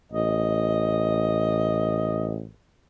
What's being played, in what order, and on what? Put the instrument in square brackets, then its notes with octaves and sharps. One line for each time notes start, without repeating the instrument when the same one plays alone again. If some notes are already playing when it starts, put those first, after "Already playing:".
[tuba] A1 [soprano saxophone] D#5